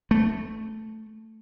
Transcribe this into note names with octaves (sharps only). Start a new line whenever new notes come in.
A3